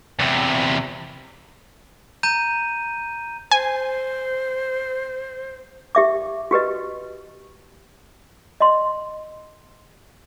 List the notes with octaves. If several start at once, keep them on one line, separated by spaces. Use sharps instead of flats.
E2 C3
A#5 G6 D#7
C5 G#5
G4 E5 D6
F#4 G4 B4 D#5
D#5 C6